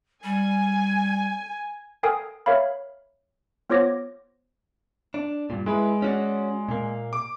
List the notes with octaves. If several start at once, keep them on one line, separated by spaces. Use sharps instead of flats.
G3 G#5
A4 A#4 G5 G#5 D#6 C7
A#4 C#5 E5 F5 B5
B3 F4 C5 C#5 D6 A#6
D4
G2 A#2
G#3 E4 B4
C#4 F#4 D5
A#2 A#3
D6